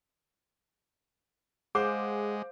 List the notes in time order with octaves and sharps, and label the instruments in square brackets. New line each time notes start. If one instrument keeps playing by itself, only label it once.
[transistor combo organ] G#3 [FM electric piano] G#4 F#5 [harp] C5 F5 [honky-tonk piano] D6